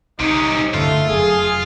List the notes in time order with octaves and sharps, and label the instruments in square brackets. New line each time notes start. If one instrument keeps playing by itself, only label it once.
[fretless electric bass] C2 [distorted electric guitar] C3 C#4 [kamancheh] D#4
[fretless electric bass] G2 D3 C#4 [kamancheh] A3 [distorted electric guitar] F4
[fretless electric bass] F1 F#2 [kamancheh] G#4